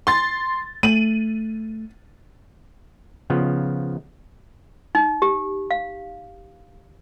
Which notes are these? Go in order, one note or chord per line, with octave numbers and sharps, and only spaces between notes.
C6 A6
A3 D#7 F#7
C#3 F3 B3
D#4
G4
F5